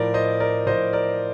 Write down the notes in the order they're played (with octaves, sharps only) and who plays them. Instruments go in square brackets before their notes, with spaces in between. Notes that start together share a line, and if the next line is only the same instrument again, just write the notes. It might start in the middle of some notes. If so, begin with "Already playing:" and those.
Already playing: [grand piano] A2 F3 A#4 D5
C5 D#5
A#4 D5
A2 F3 C5 D#5
A#4 D5